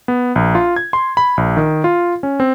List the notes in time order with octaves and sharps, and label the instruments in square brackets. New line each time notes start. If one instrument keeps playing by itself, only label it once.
[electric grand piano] B3
A#1
F4
G#6
C6
B5
A#1
D#3
F4
C#4
C4